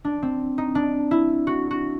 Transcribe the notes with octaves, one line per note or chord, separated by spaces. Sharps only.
D4
C4
D#4
D4
E4
F#4
F#4